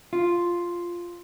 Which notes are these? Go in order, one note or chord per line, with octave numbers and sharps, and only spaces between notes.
F4